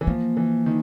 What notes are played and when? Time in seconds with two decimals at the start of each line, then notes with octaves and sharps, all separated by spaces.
0.01 E3
0.07 F3 A#3
0.37 E3
0.66 D#3